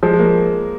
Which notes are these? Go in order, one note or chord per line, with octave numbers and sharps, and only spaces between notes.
F3 G#3
G#3
A#3